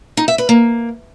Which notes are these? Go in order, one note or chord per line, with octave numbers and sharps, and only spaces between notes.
D#4
E5
B4
A#3